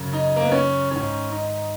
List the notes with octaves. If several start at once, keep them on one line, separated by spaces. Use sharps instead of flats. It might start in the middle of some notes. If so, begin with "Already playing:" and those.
Already playing: F#2 C#3
D#4
A#3
B3
C#4
G#2 D#3 C#4
D#4